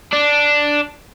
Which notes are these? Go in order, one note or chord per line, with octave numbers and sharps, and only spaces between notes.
D4